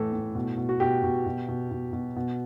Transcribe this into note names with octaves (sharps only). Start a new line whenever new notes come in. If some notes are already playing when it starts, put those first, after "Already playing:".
Already playing: A2 E3 A4
A2
B2
B2
F#4
B2 G4
B2
B2
B2
B2
B2
B2